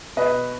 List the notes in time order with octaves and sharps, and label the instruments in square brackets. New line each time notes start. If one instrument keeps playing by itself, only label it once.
[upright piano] B2 B4 D#5